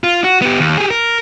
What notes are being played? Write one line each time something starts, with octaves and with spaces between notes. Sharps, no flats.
F4
F#4
B3 G4
D#2
G4 G#4
A#4